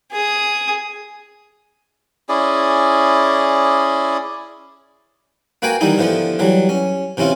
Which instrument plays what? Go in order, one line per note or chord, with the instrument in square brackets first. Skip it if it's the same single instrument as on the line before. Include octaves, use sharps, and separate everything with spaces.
[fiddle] G#4 D#6
[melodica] C#4 E4 G#4 D5
[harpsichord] A#3 F#4 B4 G5 G#5
D#3 E3 G3 D#4 E4
D3 E3 F3 B3
E3 F#3 G3
C#4
C3 E3 C#4 E4 F4